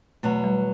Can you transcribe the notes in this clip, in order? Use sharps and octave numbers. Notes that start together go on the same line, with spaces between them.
E2 B2 F#3 A3
G3